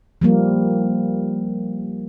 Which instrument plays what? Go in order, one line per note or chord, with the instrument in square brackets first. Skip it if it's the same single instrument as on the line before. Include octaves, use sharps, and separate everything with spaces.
[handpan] F3 G3 A#3